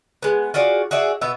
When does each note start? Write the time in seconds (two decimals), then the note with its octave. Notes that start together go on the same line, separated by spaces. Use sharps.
0.22 G#3 B3
0.54 F4 F#4 G#4 D5
0.91 F#4 G#4 D5 E5
1.21 B2 B3 E5